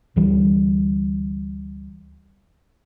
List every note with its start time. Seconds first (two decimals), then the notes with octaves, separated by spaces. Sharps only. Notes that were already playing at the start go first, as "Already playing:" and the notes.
0.16 D2 E3 G3